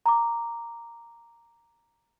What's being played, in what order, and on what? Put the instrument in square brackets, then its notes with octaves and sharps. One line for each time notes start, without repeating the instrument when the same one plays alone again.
[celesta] A#5 D6